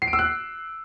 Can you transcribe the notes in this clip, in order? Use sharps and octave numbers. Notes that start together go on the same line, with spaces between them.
C7
D7
E6
F#6